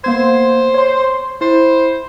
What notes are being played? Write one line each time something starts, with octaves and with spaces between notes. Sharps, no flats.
A#3 B3 C5 G#6
C#5 C6
E4 C5